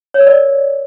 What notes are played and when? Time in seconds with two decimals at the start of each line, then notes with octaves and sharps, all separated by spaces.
0.14 C#5
0.20 A#4
0.27 D5